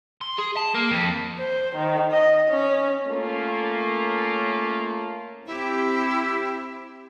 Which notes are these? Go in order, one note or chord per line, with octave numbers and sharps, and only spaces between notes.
C6
G#4
A5
A#3
F2
C5
D#3
D#5
C#4
A3 A#3 C#4 F4 A#4
C4 E4 G4